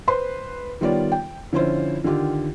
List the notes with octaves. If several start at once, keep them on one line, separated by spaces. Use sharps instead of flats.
B4 C5 C6
D#3 G3 B3 F4 C#5 D5
G5
D3 F3 C#4 E4 F4 C5
D3 D#3 F4 G4